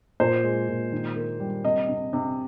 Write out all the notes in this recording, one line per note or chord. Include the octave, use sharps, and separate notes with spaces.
A#2 C5
G#3
A#2
D#3
A#3
G3
C3 D#5
C3
C3